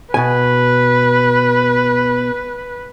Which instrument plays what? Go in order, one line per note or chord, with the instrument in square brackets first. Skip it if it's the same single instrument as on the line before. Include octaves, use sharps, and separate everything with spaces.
[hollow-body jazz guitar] B2 G#5 [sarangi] B4